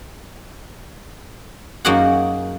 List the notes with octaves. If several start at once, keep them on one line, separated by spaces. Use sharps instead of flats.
F#2 A#3 D#4 F#4 G#4 F#5